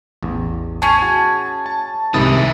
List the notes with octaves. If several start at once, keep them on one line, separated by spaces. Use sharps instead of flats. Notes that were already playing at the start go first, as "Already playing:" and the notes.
A1 E2
C#4 G#4 G#5 A5
F#4
A5
C2 G#2 C3 D#3 E4 D#6 A6